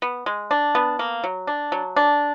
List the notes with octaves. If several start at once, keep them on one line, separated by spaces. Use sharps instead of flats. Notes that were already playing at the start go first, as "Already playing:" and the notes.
B3
G#3
D4
B3
A#3
F#3
D4
F#3
D4